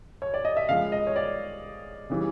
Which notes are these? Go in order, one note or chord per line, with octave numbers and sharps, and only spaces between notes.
C#5
D5
D#5
E5
C#3 F3 G#3 F5
D#5
C#5
D5
C#3 E3 G3